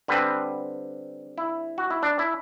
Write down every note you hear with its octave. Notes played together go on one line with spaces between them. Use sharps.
D3 G3 C4 B4
E4
F#4
E4
D4
E4